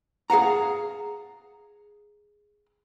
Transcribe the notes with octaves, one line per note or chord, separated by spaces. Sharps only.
G#4 F5 F#5 A#5